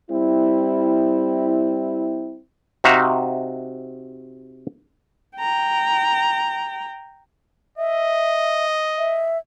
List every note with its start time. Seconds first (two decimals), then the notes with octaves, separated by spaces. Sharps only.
0.11 G3 C4 E4
2.84 C3 D#4 F#4 E5 F5
5.38 G5 A#5
7.78 D#5 E5
8.98 E5